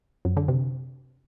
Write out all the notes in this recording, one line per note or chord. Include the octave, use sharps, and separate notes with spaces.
F#2
D3
C3